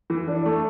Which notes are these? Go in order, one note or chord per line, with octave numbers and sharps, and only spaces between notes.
E3
D4
A3